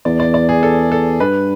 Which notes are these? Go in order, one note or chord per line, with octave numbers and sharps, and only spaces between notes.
E2 D5
D5
D5
G#4
A4
A4
G2 B4